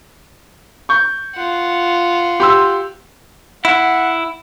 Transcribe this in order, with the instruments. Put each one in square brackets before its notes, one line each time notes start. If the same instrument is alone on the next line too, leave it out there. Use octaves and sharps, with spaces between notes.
[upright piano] C#6 G6
[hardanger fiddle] F4 F#5
[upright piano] G4 C6 E6
[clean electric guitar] E4 [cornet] F#5